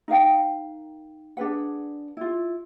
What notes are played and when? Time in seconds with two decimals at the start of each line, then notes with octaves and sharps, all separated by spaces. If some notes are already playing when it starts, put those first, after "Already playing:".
0.08 D#4 A#4 F5 G5
1.37 D4 G#4 B4 F#5
2.17 E4 F4